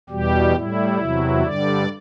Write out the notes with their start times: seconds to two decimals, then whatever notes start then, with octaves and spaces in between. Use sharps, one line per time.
0.09 E2 B2 G3 G4
0.54 A2 G3 E4
0.98 E2 C3 F#3
1.42 G2 D3 G3 D5